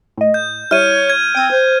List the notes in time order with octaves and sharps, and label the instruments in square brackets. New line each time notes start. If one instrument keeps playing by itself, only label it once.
[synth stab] A2 D#5
[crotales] G6
[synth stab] G3 E4 [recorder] C#5 [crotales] F6 D#7
[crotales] G#6
[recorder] C4 [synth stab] G5 D#7
[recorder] C5